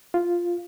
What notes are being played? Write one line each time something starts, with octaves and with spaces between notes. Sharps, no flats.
F4